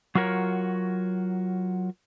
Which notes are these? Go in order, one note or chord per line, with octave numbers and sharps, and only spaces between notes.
F#3 F4 F#4 A#4 C#5